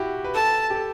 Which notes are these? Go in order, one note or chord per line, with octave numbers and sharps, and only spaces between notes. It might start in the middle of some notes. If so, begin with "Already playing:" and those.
Already playing: E4 F#4 G4
B4
A4 A5
G4
A4